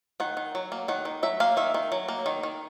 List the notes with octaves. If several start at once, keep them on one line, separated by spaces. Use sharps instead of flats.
D#3 F#5
D#3
F#3
A#3
D#3 F#5
D#3
F#3 E5
A#3 F5
D#3 E5
D#3
F#3
A#3
D#3
D#3